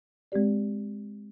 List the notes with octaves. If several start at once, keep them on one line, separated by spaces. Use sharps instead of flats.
G#3 C4 G4 D5